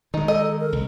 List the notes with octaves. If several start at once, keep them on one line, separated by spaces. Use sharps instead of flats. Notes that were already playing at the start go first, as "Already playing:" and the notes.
D#3 G#3 D#4
A4 D#5 A#5
A#4
C2